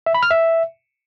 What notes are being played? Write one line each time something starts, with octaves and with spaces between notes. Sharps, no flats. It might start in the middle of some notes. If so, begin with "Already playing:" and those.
E5
B5
F6
E5